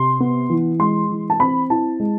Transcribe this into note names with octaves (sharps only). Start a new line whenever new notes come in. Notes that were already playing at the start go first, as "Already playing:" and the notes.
Already playing: C3 C6
B3
E3
G#3 C6
E3
A5
C4 B5
E4 A5
G#3